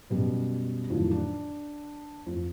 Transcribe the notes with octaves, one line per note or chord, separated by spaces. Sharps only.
F#2 B2 G3 B3
F2 A2 D3 D#3 F3 F#3
D4
F2